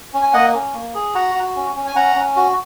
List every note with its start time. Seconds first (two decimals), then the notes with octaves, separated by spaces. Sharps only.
0.14 C#4
0.22 G#5
0.33 A#3 D#5 F#5
0.55 C#4
0.74 A#3
0.95 G#4
1.14 F#4 F#5 A#5
1.35 F#4
1.56 C#4
1.76 C#4
1.86 G#5
1.96 C#4 F#5 A#5
2.16 C#4
2.36 F#4